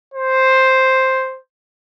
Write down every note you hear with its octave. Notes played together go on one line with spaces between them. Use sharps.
C5